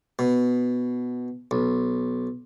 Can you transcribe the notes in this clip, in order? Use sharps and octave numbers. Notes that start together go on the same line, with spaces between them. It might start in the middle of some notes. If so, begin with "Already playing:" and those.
B2
B1